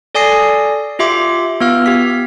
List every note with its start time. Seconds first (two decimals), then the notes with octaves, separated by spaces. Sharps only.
0.15 A4 D5 G#5 D#6 A#6 C7
0.99 F4 G4 E5 C6 D6
1.61 B3 F4 F5 F6
1.86 G4 B6